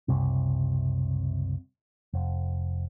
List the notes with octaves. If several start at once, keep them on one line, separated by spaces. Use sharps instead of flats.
F#1 C2 C3
F1